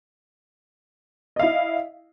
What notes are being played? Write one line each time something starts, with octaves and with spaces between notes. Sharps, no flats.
E4 D#5 F5